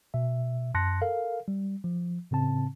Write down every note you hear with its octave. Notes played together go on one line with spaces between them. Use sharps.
B2 E5
F#2 A5 C6 F#6 A#6 C#7
A4 A#4 F5
G3
F3
A2 C#3 C4 A5